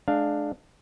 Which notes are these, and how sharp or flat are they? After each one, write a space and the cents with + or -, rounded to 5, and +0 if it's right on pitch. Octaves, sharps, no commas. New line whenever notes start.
G#3 +35 D4 +15 F5 +0